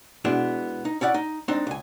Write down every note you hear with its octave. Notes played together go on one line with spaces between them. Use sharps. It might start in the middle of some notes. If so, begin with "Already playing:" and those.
B2 G#3 B3 D4 E4
D#4
C#4 E4 D5 F#5
D#4
G#3 C4 D4 D#4
C#2 G#5